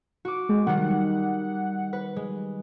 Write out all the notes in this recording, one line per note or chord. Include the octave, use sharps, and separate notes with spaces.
F#4 D6
G#3
D#3 G3 F#5
B4
G#3